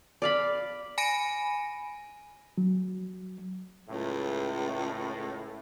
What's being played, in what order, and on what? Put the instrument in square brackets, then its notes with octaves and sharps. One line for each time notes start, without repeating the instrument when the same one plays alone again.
[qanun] D5 F5 B5
[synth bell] G#5 B5 A#6 D7 D#7
[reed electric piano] F#3
[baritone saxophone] C#2 [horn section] A2